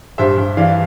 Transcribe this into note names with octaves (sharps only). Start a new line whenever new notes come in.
G2 C5 E5
G2
E3 D5 F5